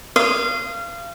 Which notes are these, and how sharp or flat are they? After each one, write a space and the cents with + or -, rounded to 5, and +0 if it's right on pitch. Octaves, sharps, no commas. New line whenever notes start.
F5 -25 D#6 +0